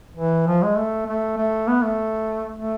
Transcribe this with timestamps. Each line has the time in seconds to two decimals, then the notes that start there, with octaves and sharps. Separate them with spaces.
0.17 E3
0.47 F3
0.62 G#3
0.77 A3
1.07 A3
1.37 A3
1.68 B3
1.83 A3
2.57 A3